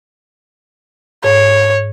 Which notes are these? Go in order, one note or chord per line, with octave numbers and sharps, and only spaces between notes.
G#2 C#5